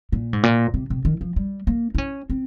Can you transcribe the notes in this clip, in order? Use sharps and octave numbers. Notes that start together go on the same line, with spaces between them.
A#2
G#2
A#2
C3
C3
D#3
F3
G3
A#3
D#4
C#4
C4